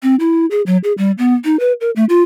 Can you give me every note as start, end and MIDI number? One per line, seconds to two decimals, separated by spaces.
0.03 0.15 60
0.20 0.46 64
0.51 0.62 68
0.66 0.77 54
0.84 0.93 68
0.98 1.11 55
1.18 1.35 59
1.45 1.59 63
1.60 1.73 71
1.81 1.90 70
1.96 2.05 57
2.09 2.22 65